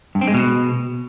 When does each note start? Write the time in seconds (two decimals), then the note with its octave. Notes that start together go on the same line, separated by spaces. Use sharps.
0.15 G2
0.21 C4
0.28 G#3
0.34 B2